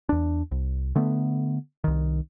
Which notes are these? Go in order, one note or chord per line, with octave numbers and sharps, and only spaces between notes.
E2 D4
C2
D3 A3 B3
C2 D#3